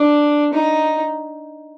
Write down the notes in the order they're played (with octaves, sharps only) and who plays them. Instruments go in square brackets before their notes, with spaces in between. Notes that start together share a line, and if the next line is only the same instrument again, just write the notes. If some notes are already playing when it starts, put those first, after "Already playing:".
Already playing: [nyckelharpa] D4
D#4